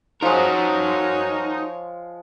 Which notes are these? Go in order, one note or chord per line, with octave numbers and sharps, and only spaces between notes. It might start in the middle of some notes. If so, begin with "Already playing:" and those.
F3 G#3 D#4 F#4 A#4 C#5